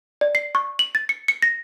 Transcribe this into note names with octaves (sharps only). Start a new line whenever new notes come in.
D5
C7
C#6
F#7
A6
C#7
C#7
A#6